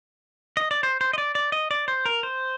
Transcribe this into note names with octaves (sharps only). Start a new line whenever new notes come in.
D#5
D5
C5
C5
D#5
D5
D5
D#5
D5
C5
A#4
C5